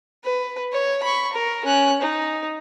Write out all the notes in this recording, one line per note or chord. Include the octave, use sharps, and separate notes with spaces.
B4
C#5
B5 C#6
A#4
C#4 F#6
D#4